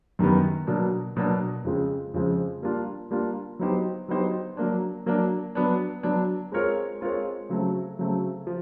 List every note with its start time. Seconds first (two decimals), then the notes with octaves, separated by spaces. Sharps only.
0.19 F#2 D#3 G3 B3
0.67 B2 F#3 A#3 D4
1.17 B2 F#3 A#3 D4
1.64 F2 C#3 F3 G#3 C4
2.14 F2 C#3 F3 G#3 C4
2.62 G3 A#3 D4 F4
3.11 G3 A#3 D4 F4
3.59 F#3 B3 D#4 G4 C5
4.08 F#3 B3 D#4 G4 C5
4.57 F#3 A#3 D4
5.06 F#3 A#3 D4
5.55 F#3 B3 D4
6.03 F#3 B3 D4
6.52 G#3 C4 F4 A#4 C#5
7.01 G#3 C4 F4 A#4 C#5
7.49 C#3 F#3 A3 C4
7.99 C#3 F#3 A3 C4
8.47 F3